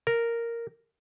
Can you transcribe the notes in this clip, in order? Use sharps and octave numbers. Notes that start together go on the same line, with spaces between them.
A#4